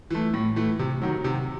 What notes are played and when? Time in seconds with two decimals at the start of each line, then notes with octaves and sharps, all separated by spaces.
0.10 E3 A3
0.34 A2
0.56 E3 A3
0.79 C3
1.02 D#3 F#3
1.24 C3